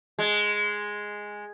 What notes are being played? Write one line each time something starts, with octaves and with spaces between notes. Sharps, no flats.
G#3